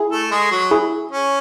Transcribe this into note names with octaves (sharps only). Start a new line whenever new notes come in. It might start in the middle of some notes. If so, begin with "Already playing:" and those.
Already playing: E4 G#4
A3 A4
G#3 G#4
F#3 F#4
E4 G#4
C#4